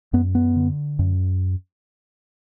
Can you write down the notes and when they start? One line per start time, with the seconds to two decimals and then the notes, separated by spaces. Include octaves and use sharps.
0.13 F#2 B3
0.35 B3
0.56 D3
0.99 F#2